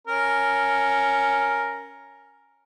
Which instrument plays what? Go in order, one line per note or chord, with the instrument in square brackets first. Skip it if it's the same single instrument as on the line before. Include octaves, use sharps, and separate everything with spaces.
[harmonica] C#4 A#4